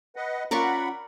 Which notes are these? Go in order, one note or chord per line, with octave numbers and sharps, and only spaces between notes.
B4 D#5 F#5
C#4 F4 A#4 D5 F#5 B5 C#6